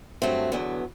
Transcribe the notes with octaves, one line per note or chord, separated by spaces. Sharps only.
G2 F#3 A3 C4
E2 D3 F#3 B3